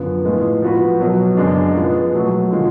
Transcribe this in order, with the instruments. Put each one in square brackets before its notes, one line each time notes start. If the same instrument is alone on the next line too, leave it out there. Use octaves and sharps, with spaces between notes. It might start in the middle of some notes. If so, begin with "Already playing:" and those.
Already playing: [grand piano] F#2 D3 F3 B3
A2 G#3 B3 F4
F3 B3 F#4 B4
B2 F#3 B3
F#2 C#3 G#3 D4
F3 G#3 B3
B2 F#3 A3
D3 F3 G#3